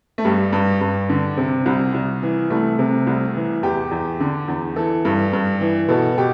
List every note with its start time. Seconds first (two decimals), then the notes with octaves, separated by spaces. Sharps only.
0.18 A3
0.25 G2 G3
0.53 G2
0.81 G2
1.09 D3
1.37 C3
1.66 C2
1.94 C2
2.23 E3
2.50 C2 A3
2.79 C3
3.07 C2
3.36 E3
3.63 E2 G4
3.91 E2
4.20 D3
4.48 E2
4.76 E3 A4
5.05 G2
5.33 G2
5.61 E3
5.88 B2 A4
6.18 B2 G4